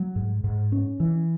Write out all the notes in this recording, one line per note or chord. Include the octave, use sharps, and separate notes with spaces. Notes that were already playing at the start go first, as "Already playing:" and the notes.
Already playing: F#3
G#2
G#2
C#4
E3